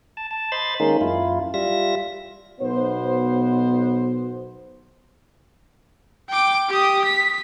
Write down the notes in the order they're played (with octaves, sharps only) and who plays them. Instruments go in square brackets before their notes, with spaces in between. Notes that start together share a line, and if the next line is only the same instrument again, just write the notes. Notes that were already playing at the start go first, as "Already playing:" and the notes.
[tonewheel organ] A5
A5
C5 D#5 B5 C6 A6
D#3 G#3 A#3 C#4 D#4
F#2 E4 F4
G3 F4 E5 A#6
[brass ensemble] B1 B2 B3 C5
[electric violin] G5 D6
G4 D#6
B6